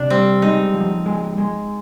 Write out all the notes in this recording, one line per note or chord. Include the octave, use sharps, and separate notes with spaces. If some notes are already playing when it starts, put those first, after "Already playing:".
Already playing: C3 D4
G3 C4
G#3 D#4
F3
G#3
G#3